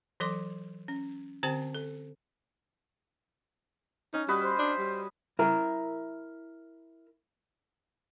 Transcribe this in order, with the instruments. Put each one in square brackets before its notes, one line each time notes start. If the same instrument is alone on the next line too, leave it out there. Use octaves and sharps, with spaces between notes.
[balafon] E3 F#3 A4 C6 D6
C#4
D3 C4 G4 C5 G5 A5
A4
[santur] C#4 [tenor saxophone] D#4
[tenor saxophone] G3 [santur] F#4 B4 D#5
[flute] C5
[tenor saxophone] D4
G3
[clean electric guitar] E4 A#4 E5 A#5